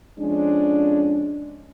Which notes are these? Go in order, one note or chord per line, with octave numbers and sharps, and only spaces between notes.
F2 F3 G#3 C#4 D4